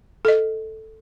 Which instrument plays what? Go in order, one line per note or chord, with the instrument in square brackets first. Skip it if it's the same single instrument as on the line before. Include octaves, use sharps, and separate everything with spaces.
[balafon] A4 D#5